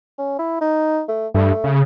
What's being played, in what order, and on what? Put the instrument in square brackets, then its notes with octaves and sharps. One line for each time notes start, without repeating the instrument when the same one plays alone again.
[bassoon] C#4
E4
D#4
A3
[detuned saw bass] G2 [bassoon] A3
[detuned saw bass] C#3